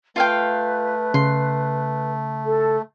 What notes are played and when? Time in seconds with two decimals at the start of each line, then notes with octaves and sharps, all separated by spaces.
0.16 A3 F4 B4 F5 G5
1.14 C#3 C6
2.45 A4